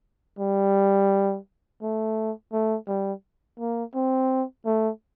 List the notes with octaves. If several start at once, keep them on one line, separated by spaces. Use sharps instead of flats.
G3
A3
A3
G3
A#3
C4
A3